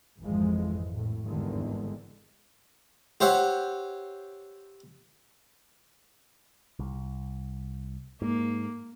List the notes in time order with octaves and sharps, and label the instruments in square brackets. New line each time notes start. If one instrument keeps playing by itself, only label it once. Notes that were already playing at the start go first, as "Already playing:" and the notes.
[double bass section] G#1 F2 E3 F3 G#3
G#1 A2
G#1 E2 G2 D3 D#3 G#3
[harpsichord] G4 C5 C#5 E5 F#5
[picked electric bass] C2
[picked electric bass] G#2 [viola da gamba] A#3